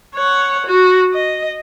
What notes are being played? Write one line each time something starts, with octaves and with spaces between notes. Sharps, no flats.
C#5 F#5
F#4
D#5